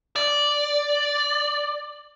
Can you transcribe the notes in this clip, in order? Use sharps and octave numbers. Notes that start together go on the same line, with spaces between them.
D5